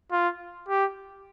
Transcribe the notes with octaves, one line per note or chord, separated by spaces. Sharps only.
F4
G4